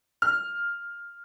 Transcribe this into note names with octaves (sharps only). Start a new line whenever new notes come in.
F6